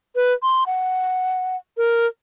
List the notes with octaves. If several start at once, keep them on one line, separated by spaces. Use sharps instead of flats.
B4
C6
F#5
A#4